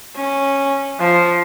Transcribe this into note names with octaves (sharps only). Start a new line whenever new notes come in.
C#4
F3